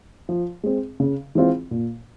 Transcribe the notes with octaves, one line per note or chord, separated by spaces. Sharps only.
F3
G#3 C4
C#3
E3 G#3 C4 F4
A#2